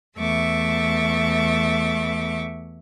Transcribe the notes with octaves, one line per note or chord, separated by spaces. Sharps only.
E2 A3 E5 C#6 D6